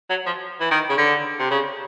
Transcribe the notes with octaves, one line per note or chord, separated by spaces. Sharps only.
F#3
F3
E3
D#3
C#3
D3
C3
C#3